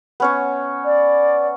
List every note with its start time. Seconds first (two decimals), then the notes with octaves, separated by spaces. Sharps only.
0.20 B3 C#4 C#5
0.85 D5